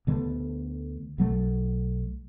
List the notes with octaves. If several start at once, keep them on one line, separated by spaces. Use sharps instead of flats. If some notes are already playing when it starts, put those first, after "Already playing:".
D2 D3 A3 B3
B1 F#3 A3